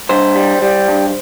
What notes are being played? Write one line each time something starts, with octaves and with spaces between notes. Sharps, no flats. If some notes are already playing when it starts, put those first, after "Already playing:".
G2 C5
G3
G3
G2